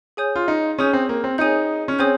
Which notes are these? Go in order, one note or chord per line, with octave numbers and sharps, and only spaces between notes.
G#4 C#5 G#5 D#6 G6
F4
D#4
C#4 G#4 C#5 G#5 D#6 G6
C4
A#3
C4
D#4 G#4 C#5 G#5 D#6 G6
C#4
C4 G#4 C#5 G#5 D#6 G6